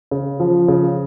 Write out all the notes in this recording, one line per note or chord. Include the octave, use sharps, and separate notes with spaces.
C#3
F3
C#3